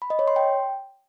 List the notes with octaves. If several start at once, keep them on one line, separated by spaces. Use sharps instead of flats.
B5
D#5
C#5
C6
G5